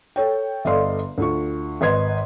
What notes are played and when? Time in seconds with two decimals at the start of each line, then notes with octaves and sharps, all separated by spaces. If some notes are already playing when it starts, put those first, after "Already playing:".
0.16 A4 C#5 G5
0.65 G1 A4 D5 D#5 F5 C6
1.18 D2 F4 C#6
1.81 G#1 B4 D#5 C6 G#6